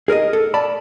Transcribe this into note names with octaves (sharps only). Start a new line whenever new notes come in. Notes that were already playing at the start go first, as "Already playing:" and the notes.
G#4 A#4 B4 D#5
A4
D5 A5 B5